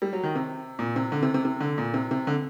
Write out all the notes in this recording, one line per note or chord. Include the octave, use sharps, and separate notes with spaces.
G3
F#3
D#3
C3
A#2
C3
D3
C3
C3
C3
D3
A#2
C3
C3
D3